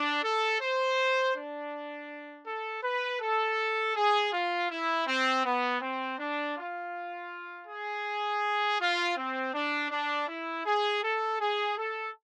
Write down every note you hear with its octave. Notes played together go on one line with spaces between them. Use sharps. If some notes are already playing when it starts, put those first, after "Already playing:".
Already playing: D4
A4
C5
D4
A4
B4
A4
G#4
F4
E4
C4
B3
C4
D4
F4
G#4
F4
C4
D4
D4
E4
G#4
A4
G#4
A4